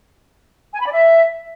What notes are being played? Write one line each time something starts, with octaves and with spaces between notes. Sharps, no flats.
G#5
B5
D5
E5